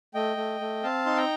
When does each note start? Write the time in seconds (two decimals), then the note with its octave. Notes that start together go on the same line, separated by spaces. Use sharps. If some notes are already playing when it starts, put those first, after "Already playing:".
0.14 A3 D#5 G5
0.37 A3
0.60 A3
0.83 C4 F5 A5
1.06 D#4 C6
1.17 G5 A#5